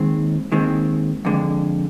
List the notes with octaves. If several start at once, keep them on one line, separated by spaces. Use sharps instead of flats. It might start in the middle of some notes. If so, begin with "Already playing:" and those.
Already playing: D#2 D#3 G#3 C4
D#2 D#3 G#3 C4
F2 D3 G#3